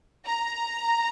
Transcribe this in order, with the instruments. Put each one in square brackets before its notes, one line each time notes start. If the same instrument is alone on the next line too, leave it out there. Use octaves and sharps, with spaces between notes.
[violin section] A#5